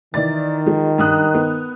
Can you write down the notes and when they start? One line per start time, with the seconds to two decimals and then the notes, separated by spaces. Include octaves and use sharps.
0.14 D#3 E3 D5 A6
0.66 F3 G#3
0.98 G2 D#6 F#6
1.35 B3